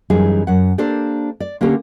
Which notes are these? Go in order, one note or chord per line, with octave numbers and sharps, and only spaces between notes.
F#2 E3 G3 D#4 G#4
F#2 F#5
A#3 D4 G4 A4 C5 D5
D5
D3 A#3 C#4 G4 A4